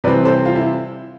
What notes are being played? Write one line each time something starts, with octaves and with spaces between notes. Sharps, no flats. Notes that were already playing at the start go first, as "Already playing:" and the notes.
C3 E3 G3 C4 B4 D5
A4 C5
F4
E4